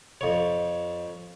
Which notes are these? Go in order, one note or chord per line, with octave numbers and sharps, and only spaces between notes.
F2 C#5